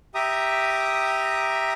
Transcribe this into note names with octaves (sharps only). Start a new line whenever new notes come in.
G4 E5 A#5 D#6